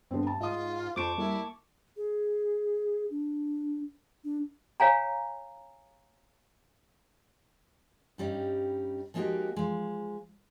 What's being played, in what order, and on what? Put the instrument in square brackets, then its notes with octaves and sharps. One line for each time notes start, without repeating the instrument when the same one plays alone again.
[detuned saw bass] G2 [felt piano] D3 B3 C4
[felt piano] A5
[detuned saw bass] G#2 [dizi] F4 [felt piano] D#5 D#6
[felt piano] F2 F3 D7 [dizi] C5 [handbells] A5 C#6 D6
[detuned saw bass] G3 [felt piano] A#3 [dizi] E4
[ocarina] G#4
D4
D4
[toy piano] C#5 F5 G#5 A#5
[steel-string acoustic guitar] G2 G3 C#4 D#4
F3 G#3 A#3 D#4 F#4 G4
F3 G#3